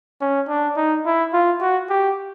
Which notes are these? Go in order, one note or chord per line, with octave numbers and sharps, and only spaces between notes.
C#4
D4
D#4
E4
F4
F#4
G4